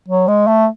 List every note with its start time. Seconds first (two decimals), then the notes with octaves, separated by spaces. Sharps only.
0.08 F#3
0.28 G#3
0.47 A3